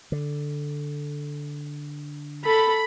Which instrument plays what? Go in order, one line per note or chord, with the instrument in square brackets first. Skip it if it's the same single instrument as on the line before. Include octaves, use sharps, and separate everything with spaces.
[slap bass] D3
[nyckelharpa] A4 [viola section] B5